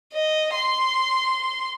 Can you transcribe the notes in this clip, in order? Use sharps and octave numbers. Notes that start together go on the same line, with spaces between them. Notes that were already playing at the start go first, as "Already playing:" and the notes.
D#5
C6